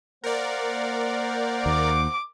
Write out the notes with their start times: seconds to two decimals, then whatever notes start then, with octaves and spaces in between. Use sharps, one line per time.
0.24 A#3 A#4 C5 D5 F#5
1.66 D#2 D6